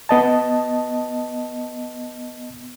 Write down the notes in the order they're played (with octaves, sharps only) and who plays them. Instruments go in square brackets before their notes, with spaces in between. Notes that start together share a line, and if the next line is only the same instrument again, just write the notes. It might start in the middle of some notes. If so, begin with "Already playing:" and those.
[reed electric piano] B3 D#5 A5